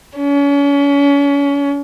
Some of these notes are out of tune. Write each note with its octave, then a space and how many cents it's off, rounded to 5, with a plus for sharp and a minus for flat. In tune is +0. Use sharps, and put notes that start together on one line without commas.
C#4 +35